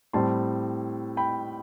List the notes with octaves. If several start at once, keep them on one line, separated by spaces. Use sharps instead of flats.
A2 G3 C4 A5 C6
G5 B5